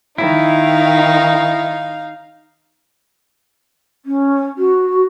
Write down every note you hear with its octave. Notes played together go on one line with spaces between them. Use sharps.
D#3 D#4 E4 F5
C#4
F#4